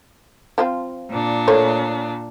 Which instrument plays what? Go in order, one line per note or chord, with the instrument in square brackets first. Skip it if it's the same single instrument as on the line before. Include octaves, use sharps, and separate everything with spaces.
[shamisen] F3 C4 F4
[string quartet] A#2 D4
[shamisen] A3 A#3 C#5